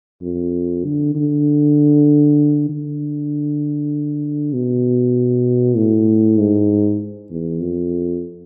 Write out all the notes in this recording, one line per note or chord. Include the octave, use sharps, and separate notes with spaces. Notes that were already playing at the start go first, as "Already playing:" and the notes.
F2
D3
D3
D3
B2
A2
G#2
E2
F2